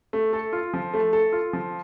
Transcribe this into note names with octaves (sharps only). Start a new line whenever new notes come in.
A3
A4
F4
F3
A3
A4
F4
F3